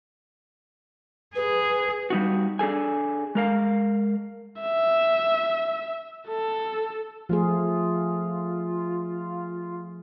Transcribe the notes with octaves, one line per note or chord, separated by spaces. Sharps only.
G#4 B4
G3 D#4 F#4
D4 G#4 A4 G#5
G#3 A#4 F5
E5
A4
F3 A3 F4 G#4